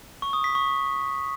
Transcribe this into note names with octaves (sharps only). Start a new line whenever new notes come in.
C#6
D#6
B6
C#6